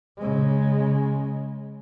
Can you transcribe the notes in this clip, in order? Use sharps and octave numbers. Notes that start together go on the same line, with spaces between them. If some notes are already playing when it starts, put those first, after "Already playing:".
C#3 G#3